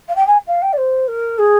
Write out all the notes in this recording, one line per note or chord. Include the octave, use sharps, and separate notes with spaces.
F5
G5
G#5
F5
G5
D5
C5
A#4
G#4